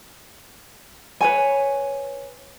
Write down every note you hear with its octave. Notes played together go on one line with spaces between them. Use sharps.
B4 C#5 G#5